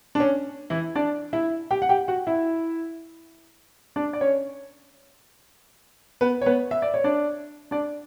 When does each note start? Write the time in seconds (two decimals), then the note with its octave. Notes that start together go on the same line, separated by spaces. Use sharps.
0.15 D4
0.20 C#4
0.70 E3 E4
0.95 D4 D5
1.33 E4 E5
1.71 G4 G5
1.82 F#5
1.89 G4 G5
2.08 F#4 F#5
2.27 E4 E5
3.96 D4 D5
4.13 D5
4.21 C#4 C#5
6.21 B3 B4
6.41 C#5
6.46 B3 B4
6.71 E5
6.82 D5
6.94 C#5
7.04 D4 D5
7.71 D4 D5